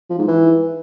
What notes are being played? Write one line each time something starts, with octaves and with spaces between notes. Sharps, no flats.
F3
G#2
E3